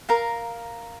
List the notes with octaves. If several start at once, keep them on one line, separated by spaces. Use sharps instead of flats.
A#4 F5 A#5